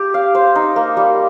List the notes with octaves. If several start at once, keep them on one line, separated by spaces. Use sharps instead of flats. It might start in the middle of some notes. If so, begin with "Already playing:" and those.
Already playing: G4
F5
C5
D#4
A#3
G3